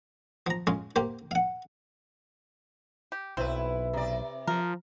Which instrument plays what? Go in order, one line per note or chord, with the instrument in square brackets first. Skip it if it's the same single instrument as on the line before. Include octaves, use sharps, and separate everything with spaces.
[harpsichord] F3 A#5
G#3 C#4 F4
A#3 G4 C5
F5 F#5
[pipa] G4
[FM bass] B1 [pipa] C4 [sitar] E4 B4
[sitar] C3 D5
[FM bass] F3 [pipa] A#4